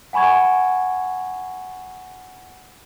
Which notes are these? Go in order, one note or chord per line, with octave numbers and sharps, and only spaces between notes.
F#5 G#5 B5 C#6 G#6